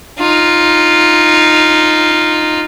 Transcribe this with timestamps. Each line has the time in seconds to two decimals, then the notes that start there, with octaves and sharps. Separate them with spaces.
0.19 D#4 F4